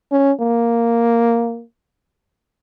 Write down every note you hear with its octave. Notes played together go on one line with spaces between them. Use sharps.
C#4
A#3